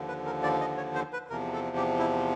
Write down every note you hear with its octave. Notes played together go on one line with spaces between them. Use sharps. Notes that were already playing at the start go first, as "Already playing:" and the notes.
Already playing: D#2 D3 F3
B4
A#4
D5
D#5
C#5
C5
B4
E2 C3 F3 A#4
A4
G4
E4